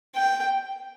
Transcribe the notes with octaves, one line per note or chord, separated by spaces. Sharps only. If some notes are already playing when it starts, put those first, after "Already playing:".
G5